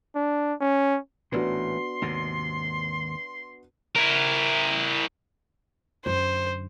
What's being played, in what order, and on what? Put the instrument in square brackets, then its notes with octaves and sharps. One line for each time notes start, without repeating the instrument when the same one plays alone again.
[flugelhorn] D4
C#4
[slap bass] A1 A#2 [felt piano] B3 D4 F#4 [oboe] C6
[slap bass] D#2 G#2 C3
[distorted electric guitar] E4 A#4
[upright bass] F#2 D3 [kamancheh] C5